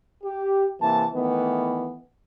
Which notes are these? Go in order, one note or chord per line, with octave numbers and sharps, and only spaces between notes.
G4
C3 E3 A#3 A5
D#3 E3 A3 B3